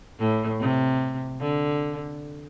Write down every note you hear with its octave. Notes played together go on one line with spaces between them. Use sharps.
A2
C3
D3